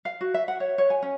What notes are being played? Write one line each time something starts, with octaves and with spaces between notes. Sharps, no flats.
F5
F#4
E5
F#5
C#5
C#5
G#5
C#4